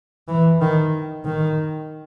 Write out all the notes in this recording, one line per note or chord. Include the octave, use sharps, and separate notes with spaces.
E3
D#3
D#3